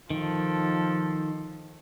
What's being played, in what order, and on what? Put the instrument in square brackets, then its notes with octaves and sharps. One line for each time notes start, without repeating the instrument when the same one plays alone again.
[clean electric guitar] D#3 [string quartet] F3 A4